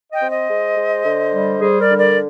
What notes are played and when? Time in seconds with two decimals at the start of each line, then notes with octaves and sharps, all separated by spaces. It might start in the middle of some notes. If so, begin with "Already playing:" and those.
0.12 D#5 G5
0.22 C4
0.30 C5 D#5
0.49 G#3
0.77 G#3
1.06 D3
1.33 G3
1.61 G3 G#4 C5
1.80 A#4 D5
1.90 D3
1.98 A#4 D5